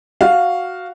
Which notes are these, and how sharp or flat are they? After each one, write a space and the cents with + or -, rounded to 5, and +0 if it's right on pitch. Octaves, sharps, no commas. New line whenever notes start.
F#4 +0 F5 +0